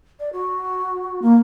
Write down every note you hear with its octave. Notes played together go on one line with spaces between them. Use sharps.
D5
F#4
A#3